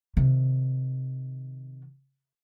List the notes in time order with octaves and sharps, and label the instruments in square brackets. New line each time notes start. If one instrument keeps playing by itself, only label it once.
[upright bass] C3 D#3